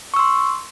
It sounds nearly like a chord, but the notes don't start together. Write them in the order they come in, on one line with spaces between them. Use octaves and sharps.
C#6 E6 C6